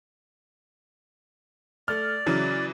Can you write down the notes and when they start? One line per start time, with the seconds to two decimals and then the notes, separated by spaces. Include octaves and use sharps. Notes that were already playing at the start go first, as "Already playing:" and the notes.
1.88 A3 D5 F6
2.26 C#3 E3 F#3